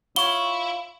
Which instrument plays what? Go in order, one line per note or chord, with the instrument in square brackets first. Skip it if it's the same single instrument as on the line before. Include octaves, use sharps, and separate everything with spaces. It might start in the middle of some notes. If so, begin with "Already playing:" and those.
[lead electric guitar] E4 [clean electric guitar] F4 C#5 [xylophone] G7